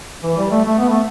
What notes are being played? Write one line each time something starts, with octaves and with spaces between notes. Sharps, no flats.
E3
G3
A3
A3
B3
A3